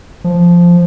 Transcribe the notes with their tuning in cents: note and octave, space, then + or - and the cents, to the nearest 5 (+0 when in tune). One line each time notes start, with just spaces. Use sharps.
F3 -5